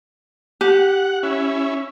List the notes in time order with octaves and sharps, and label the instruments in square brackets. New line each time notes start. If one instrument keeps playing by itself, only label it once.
[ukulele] G4 [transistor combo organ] F#5
[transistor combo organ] C#4 E4